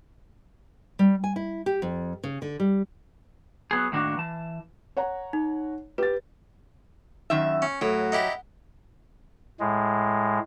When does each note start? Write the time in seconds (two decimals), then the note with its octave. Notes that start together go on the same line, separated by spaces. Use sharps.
0.99 G3
1.24 G#5
1.36 E4
1.66 G4
1.82 F2
2.23 C#3
2.42 D3
2.60 G3
3.71 F#3 B3 G#4
3.92 A2 D#3 A#3 D4 F#4
4.17 E3 A5
4.97 C#5 F#5 A#5
5.33 D#4
5.98 G4 B4 A6
7.30 F#2 D#3 E5
7.62 C#4
7.81 A2 F#3
8.12 D#4 E4 G4
9.60 A2 G#3